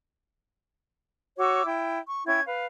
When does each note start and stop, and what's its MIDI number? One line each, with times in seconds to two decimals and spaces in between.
1.38 1.65 66
1.38 1.65 73
1.38 1.65 86
1.38 1.65 88
1.65 1.99 64
1.65 1.99 79
2.07 2.22 85
2.26 2.41 61
2.26 2.41 64
2.26 2.41 79
2.26 2.41 92
2.46 2.66 71
2.46 2.66 77